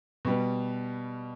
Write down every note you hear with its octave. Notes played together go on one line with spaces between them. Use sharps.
B2 G3 B3